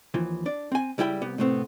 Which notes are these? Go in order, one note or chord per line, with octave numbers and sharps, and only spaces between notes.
D#2 E3 F3
D4 D5
C4 G#5
C#2 G3 E4 G5 B5
C2 B3 G4
A2 C3 A3 B3 C4